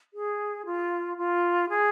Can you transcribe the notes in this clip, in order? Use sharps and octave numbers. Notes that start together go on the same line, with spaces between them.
G#4
F4
F4
G#4